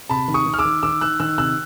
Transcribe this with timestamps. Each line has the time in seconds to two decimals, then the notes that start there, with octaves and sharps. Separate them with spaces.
0.10 C3 A5 B5
0.28 D#3
0.34 C#6 D#6
0.46 D#3
0.54 F6
0.59 D6 E6
0.65 D#3
0.83 D#3 D6 E6
1.01 D#3 E6 F#6
1.20 D#3 E6 F#6
1.38 C3 E6 F#6